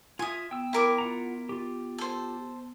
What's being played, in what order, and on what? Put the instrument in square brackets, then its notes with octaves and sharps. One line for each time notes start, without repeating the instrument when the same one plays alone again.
[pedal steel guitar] F4 E5 [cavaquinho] G#5 D#6
[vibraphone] B3 [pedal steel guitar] G5 E6
[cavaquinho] E4 A#4 D6
[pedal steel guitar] F4 F#5 A#5
F4 G4
[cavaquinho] A4 C5